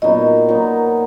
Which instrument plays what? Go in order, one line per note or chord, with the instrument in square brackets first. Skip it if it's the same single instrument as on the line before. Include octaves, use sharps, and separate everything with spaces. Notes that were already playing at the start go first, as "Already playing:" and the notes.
[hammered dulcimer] A#2 F#3 B3 D#4 [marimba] D#5
[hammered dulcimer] A#2 F#3 B3 D#4